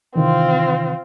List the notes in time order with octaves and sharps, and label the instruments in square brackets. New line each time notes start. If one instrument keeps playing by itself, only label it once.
[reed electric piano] C3 D#3 E3 [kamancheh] C4 F4